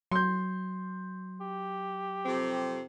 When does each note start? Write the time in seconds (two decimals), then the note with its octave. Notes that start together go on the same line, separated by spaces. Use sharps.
0.12 F#3 C6 G6
1.41 G4
2.25 F2 C3 C4